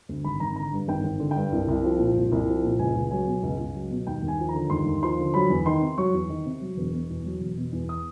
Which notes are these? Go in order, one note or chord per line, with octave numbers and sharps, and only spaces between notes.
D2
G#1 B5
G#1 A#5
D3 A#5
G2
G#1 G5
G#1
D3
G5
G2
C2
C2
F3
A#2
C2
C2
F3
A#2
C#2 G#5
C#2
F#3 G#5
B2
C#2
C#2
F#3
B2
D#2 G5
D#2
G#5
F3
A#5
D3
D#2 C6
D#2
F3 C6
D3
F#3 B5
E2
D#3 C6
C3
F#3 C#6
E2
D#3
C3
F#3
E1
B2
E2
F#3
E1
B2
E2
D#6